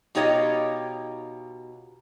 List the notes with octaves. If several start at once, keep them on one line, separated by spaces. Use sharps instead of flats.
B2 D#4 F4 G4 C#5 D#5